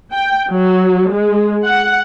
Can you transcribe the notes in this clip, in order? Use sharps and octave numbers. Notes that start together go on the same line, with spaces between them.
G5
F#3
G#3
F#5